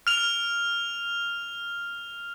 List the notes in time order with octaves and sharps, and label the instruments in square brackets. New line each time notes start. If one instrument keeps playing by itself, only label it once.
[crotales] F6 F7